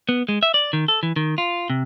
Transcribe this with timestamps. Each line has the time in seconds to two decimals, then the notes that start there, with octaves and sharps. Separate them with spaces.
0.09 B3
0.29 G#3
0.43 E5
0.54 D5
0.73 D#3
0.88 A4
1.03 E3
1.16 D#3
1.38 F4
1.70 C3